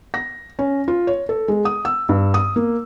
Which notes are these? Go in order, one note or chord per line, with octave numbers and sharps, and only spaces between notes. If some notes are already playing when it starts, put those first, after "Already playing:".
A#6
C#4
F4
C#5
A4
G#3
D#6
E6
G2
D#6
A#3